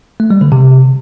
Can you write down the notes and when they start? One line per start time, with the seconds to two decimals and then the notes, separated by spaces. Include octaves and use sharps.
0.20 A3
0.31 G3
0.41 D3
0.52 C3